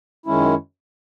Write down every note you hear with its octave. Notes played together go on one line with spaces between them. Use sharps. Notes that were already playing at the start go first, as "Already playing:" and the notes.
F#2 D#3 G#3 C#4 E4